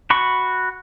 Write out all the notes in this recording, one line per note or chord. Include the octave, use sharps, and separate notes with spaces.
F#4 B5 C#6